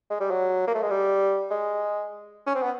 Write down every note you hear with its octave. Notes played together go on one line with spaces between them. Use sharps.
G#3
G3
F#3
A#3
A3
G#3
G3
G#3
C#4
C4
B3